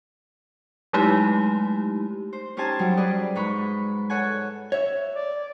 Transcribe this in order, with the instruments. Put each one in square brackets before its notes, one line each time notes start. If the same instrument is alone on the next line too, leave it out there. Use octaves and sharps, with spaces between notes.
[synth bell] F#3 G#3 A3 D#4 E4 G4
[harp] C5
C#4 D#4 G4 C5 G#5 A5
F#3 G3 D#4
G#4 B4 D5 D#5
G#2 D#4 B4 B5 C#6
A4 C#5 F#5 G#5
[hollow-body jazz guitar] C#5 E5
[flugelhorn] D5